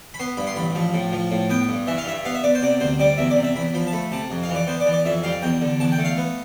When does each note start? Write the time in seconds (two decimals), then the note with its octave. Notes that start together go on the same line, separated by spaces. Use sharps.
0.14 B5
0.19 B3 C6
0.37 G2 B5
0.47 C6
0.56 A1 B5
0.75 F3
0.94 A2
1.12 F3
1.31 A2
1.49 B3 G5
1.69 G2
1.87 E3 E5
1.98 F5
2.06 G2 E5
2.25 B3 F5
2.35 E5
2.43 B3 D5
2.55 C5
2.62 C3 D5
2.80 D2 C5
2.99 G3 D5
3.18 E2 E5
3.30 D5
3.36 C3
3.43 E5
3.56 E2 B5
3.74 F3 B5
3.87 A5
3.93 A3 B5
4.12 C3 A5
4.31 F2
4.43 F5
4.49 E3
4.55 D5
4.67 B3 C5
4.80 D5
4.86 E3
4.93 D5
5.05 F2 E5
5.23 G3 F5
5.42 E2 G5
5.61 D3
5.80 E2 A5
5.92 G5
5.98 A3
6.05 F5
6.18 B3